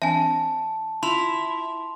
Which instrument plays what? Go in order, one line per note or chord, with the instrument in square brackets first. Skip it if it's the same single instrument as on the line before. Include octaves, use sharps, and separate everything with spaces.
[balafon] E3 C4 D4 [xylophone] E5 G#5 [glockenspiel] A5
[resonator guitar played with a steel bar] E4 [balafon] F4 [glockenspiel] C6 F7